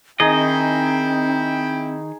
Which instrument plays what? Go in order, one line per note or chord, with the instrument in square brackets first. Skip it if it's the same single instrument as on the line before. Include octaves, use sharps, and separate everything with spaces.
[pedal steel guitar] D#3 D#5 [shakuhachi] C4 [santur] D#4 G#4 [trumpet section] E4 G5